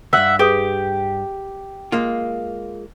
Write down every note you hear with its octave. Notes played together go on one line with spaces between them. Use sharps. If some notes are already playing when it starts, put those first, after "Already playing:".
D2 G2 E5 F#5
G4 G#4 B4 D#6
G#3 A#3 F4